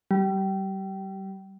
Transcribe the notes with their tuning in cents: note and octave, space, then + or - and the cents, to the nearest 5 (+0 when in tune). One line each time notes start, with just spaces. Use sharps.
G3 -25